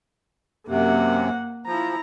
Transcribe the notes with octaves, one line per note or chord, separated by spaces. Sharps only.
F#2 C3 A#3 F#5
F3 E4 A#5